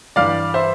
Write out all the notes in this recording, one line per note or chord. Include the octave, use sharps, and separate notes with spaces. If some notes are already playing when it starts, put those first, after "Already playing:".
G2 E3 G3 D5 F5
C5 E5